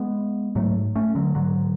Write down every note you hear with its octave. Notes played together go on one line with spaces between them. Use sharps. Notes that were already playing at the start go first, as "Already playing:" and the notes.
Already playing: G#3 B3
G#2 F#3 A3
A3 C#4
D3 F#3
G#2 D3 F#3